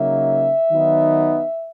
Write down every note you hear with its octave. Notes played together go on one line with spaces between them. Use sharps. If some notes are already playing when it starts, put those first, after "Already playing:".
Already playing: C#3 F#3 A#3 D#4 E5
D#3 F#3 B3 D#4